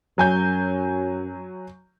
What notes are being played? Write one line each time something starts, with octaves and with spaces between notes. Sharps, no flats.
F#2 F#3 G#5 G6